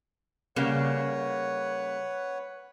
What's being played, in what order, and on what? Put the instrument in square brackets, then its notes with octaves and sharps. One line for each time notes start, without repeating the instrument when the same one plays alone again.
[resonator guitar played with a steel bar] C#3 G3 A#3 [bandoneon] B4 C#5 F#5